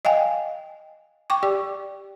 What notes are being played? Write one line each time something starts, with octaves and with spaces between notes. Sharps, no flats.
D#5 F5 G5 G#5
G5 C#6 D6
G4 D5